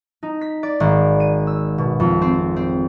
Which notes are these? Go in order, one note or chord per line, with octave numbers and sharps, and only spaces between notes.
D#4
B6
D5
G#1
D#7
E6
B2
F2
C4
C4